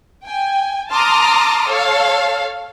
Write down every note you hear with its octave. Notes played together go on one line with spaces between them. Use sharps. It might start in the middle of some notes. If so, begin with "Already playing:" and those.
G5 G#5
A5 A#5 C6 D6 D#6 F6
A4 C#5 F5